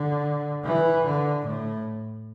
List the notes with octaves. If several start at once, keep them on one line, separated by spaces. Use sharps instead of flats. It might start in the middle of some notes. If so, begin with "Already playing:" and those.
Already playing: D3
E3
D3
A2